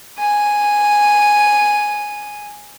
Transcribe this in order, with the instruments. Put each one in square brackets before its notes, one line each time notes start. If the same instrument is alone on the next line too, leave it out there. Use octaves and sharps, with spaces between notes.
[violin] G#5 D#7